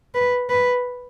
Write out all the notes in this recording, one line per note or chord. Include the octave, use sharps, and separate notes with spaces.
B4
B4